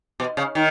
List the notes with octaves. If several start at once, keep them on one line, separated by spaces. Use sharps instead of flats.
B2
C#3
D#3